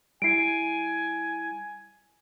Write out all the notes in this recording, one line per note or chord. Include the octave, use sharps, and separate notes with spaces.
G3 E4 G#5 C7 D7